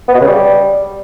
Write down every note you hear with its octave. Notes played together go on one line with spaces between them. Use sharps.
B3
B2
C#3
G3